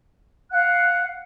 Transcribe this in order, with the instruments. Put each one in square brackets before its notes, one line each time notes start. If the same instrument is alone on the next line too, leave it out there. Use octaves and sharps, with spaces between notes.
[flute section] F5 F#5 F#6